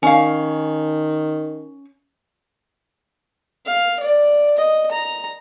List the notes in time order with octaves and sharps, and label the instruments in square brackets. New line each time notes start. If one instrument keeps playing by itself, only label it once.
[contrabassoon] D#3 [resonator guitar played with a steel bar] C#4 F5
[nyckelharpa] F5
D5
D#5
A#5